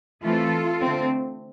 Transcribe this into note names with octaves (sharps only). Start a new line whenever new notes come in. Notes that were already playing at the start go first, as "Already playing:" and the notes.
E3 A3 C4 F4 A4
D3 A3 C4